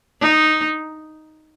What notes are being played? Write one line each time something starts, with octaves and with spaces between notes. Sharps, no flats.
D#4